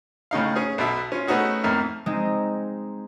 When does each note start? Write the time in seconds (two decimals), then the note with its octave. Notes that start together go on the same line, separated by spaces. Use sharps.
0.31 A2 C#3 D#4 F5
0.56 C#4 G#4
0.78 B1 B2 E5
1.12 C#4 F4
1.27 A3 B3 C#4 D#4 F#4 G#4
1.63 F2 A2 A#3 D#4 E5 F6
2.06 G#3 C4 D#4